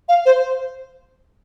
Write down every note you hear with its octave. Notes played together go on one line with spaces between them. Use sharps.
F5
C5